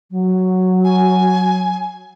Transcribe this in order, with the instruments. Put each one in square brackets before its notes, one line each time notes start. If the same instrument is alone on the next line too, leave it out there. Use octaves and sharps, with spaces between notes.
[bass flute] F#3
[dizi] G#5